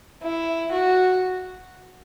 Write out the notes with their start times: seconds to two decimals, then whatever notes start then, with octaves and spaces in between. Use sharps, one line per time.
0.23 E4
0.72 F#4